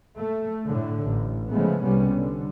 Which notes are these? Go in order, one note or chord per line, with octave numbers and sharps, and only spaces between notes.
A3
A2 D3
A1
C#3 F3 G#3 A3 B3
C2 C3 G3 B3 C#4
D3